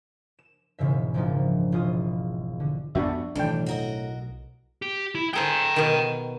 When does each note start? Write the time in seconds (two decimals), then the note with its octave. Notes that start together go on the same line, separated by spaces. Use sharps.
0.39 E7
0.79 E1 G#2 C#3 E5
1.14 D#1 G#1 F3 D4 D#4
1.72 E1 F4 D#6 D#7
2.60 D3
2.95 F2 B3 D4 F#4 E5
3.35 B1 A2 D#3 E3 D4 G5
3.66 F#4 A#4 D#5
4.82 G4
5.15 E4
5.33 G#4 A4 C5 G5 A#5
5.76 B2 D#3